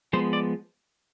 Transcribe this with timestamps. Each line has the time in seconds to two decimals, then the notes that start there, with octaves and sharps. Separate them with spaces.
0.13 F3 G#3 B3 C5
0.33 D5